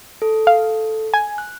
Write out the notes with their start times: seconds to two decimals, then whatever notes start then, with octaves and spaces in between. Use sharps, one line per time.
0.22 A4
0.47 F5
1.14 G#5
1.38 F#6